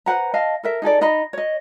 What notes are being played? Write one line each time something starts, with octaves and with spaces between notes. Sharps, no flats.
B4 C5 F#5 A#5
D#5 F5 A5
A4 A#4 E5
D#4 G#4 A4 D5
D#4 D#5 A#5 B5
C#5 D#5